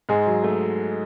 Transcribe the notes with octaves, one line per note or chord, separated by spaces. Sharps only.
G#2 G#3 G#4
F#3
A3